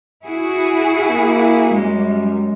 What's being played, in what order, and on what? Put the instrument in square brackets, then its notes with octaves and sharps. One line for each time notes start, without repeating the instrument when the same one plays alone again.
[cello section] E4 F#4 G#4
[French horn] A#3
[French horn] F#2 [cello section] G3 [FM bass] G#3